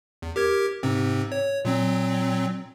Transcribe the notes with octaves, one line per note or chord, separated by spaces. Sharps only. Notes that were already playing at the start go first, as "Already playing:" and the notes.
E2
G4 A#4 G#6
G#2 C3 C4
C#5
A#2 F#3 C4